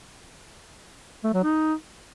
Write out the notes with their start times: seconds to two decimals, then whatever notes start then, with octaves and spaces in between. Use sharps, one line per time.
1.24 A3
1.34 F#3
1.43 D#4